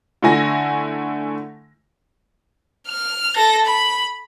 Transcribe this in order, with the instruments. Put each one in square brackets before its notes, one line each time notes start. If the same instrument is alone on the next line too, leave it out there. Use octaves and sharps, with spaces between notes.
[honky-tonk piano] D3 A3 E4 G#5 A#6
[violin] F6
A4 A#6
B5